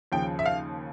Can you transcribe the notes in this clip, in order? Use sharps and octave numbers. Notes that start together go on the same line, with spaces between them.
D#2 C#3 F3 G5
E5
F5